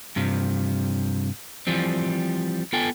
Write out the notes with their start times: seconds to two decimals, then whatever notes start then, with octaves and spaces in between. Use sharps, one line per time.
0.16 G2 C3 F3
1.67 E3 F3 G3 C4
2.73 B3 F4 A4 G5 G#5